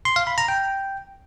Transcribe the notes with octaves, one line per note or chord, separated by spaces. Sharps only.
C6
F5
B5
A#5
G5